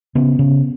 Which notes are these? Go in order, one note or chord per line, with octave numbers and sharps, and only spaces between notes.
C#3 B3
C#3